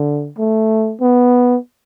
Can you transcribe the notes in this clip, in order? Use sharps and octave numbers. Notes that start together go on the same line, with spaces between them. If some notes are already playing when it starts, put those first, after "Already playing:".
Already playing: D3
A3
B3